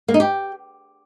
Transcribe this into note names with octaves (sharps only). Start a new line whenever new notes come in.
A#3
D#4
G4